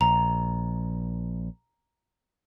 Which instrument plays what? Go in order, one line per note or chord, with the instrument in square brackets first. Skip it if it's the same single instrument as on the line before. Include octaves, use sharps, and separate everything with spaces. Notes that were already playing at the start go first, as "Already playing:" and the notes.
[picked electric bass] A#1 [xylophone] A#5